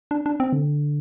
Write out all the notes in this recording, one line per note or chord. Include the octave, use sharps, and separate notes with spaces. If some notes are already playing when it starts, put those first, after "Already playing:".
D4
D4
C4
D3